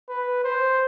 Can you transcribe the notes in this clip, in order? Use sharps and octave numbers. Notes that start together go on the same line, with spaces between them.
B4
C5